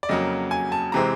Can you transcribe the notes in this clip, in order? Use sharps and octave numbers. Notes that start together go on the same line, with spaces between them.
D5
F2 C#3 F#3 A#3 D#5
G#5
A5
C3 E3 G#3 C4 A#5